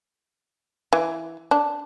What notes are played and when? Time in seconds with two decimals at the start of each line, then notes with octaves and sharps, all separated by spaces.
0.93 E3
1.51 D4